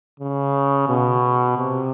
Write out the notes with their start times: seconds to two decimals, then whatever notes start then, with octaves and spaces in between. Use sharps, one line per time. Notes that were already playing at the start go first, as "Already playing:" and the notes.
0.20 C#3
0.88 B2
1.57 C3